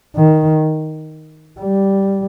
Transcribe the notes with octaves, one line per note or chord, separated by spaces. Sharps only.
D#3
G3